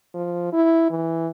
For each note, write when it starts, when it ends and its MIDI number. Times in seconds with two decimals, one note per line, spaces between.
0.14 0.48 53
0.53 0.87 64
0.90 1.28 52